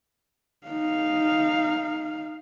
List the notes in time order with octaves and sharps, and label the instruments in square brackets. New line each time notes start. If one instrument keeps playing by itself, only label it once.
[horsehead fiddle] D#4 F5